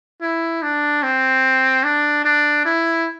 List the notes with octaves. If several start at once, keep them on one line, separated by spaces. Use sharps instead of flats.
E4
D4
C4
D4
D4
E4